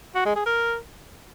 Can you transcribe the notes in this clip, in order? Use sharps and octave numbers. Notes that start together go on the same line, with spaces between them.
F#4
G#3
G#4
A#4